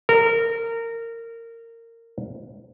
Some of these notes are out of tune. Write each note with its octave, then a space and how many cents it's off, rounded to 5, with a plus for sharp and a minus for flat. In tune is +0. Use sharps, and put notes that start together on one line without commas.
A#4 -20